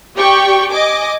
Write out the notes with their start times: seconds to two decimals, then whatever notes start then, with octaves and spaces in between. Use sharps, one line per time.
0.17 G4 D5 G5 C#6
0.72 D#5 G#5 D6